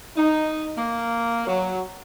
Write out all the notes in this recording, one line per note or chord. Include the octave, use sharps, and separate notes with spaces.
D#4
A#3
F#3